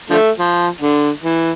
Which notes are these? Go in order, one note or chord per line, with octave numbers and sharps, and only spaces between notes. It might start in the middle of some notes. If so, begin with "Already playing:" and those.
D3 F3 A3
F3
D3
E3